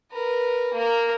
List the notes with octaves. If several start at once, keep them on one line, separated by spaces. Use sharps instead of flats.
A#4 B4
A#3 A#4